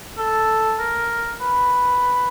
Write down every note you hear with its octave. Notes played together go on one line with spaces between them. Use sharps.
A4
A#4
B4